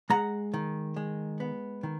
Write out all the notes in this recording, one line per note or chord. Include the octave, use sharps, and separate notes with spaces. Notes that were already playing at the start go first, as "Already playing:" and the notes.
G#3 F#5 A#5
D#3
G#3
B3
D#3